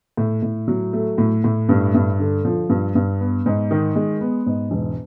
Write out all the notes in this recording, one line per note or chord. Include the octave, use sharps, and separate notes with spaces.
A2
A2
F#3
A3
A2
A2
G2
G2
D3
F3
G2
G2
B3
G#2
D#3
G#3
B3
G#2
E1